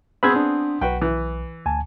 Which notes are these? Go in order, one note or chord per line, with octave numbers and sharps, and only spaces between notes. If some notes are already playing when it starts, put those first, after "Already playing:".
B3 C4 G#4 B5 E6 G#6
D4
B1 F#4 B4 G5
E3
D2 G#5 A5